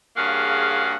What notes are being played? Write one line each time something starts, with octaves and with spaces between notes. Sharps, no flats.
G2 C#3 A#3 F#4 G#4 F5